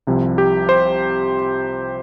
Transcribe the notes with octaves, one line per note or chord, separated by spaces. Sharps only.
C2 C3 F3
G4
C5